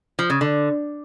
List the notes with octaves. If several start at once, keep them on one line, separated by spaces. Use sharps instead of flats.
F3
C#3
D3